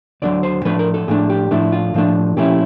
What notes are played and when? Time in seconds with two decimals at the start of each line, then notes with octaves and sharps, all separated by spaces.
0.22 D2 D3 F#3 D5
0.43 C5
0.65 A2 F3 A3 D4 B4
0.79 A#4
0.94 A4
1.08 A2 F3 A3 D4 G#4
1.30 G4
1.51 A2 F3 A3 D4 E4
1.72 F4
1.94 A2 F3 A3 D4
2.37 A#2 F3 A3 C#4 E4 G4